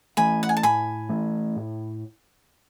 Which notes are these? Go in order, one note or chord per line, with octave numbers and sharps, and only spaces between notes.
E3 A3 G#5 B5
F#5
G#5
A5
A2 G#5 B5
E3 A3
A2